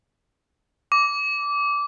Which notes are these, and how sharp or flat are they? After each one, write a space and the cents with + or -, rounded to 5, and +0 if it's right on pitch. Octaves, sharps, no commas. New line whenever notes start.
D6 -20